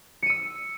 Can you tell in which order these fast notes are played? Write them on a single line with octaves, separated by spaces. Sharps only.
C#7 D#7 E6